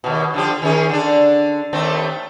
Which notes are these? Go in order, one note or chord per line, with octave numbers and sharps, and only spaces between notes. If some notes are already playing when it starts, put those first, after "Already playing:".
D#2 B2
D3 F3 G4
D#3 C#4 G#4
D3 D4
D#2 A3 C4